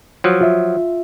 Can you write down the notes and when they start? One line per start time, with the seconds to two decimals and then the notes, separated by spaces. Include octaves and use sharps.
0.24 F3 F#3
0.41 F4 E5